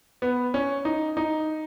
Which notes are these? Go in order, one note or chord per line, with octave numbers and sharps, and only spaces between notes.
B3
C#4
D#4
D#4